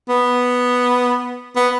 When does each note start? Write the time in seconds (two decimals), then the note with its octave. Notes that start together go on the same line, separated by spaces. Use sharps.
0.09 B3
1.56 B3